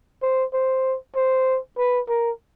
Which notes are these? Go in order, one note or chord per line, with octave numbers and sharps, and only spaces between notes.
C5
C5
C5
B4
A#4